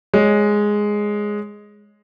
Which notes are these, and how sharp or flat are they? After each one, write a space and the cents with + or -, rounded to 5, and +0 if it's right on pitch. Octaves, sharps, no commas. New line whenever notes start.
G#3 +0 C#5 +0